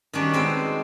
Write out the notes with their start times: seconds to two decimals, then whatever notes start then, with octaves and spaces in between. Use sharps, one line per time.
0.13 D#3 F#3 G3 C#4 D4
0.34 G#3 C4 B4 C5